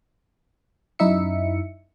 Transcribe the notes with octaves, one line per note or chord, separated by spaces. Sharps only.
F#2 D#4 E4 E5 C#7